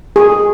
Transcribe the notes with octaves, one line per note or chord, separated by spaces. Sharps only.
G#4